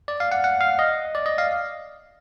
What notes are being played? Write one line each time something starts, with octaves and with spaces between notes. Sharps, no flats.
D5
F5
F#5
F#5
F5
D#5
D5
D#5
F5